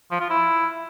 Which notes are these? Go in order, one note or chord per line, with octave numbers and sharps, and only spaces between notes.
F3
F4
E4